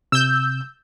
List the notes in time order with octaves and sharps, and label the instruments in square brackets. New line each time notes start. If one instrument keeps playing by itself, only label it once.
[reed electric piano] C3 [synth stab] E6 G6